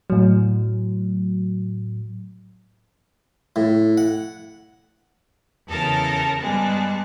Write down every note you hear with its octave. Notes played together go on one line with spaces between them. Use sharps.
A2 F#3
A2
F#5
E2 C#3 A4 A#4 A5
G2 G3 G#3 B3 A5